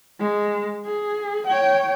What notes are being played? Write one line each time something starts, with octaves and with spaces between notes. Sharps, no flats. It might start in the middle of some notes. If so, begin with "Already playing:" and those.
G#3
G#4
C#5 G5